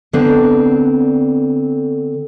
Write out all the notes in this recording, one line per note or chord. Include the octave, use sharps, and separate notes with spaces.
D3 B3 C4 D4